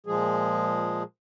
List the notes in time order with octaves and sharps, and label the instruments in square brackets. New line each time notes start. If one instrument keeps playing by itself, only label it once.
[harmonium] A#2 F3 G#3 G#4